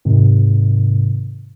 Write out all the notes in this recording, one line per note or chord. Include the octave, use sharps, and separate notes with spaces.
G#2 C3 D#3